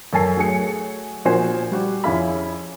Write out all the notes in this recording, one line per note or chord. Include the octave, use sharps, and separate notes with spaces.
F#2 A4 A#4 G#5 A5 C7
F#3 A3 G#4 G#5 C#7
A#2 F3 F#4 C5 G#5 C7
G3 F#4 G4
F2 C#4 E4 G#4 F5 B5